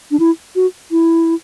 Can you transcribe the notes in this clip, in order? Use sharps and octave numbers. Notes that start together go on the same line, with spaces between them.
D4
E4
F#4
E4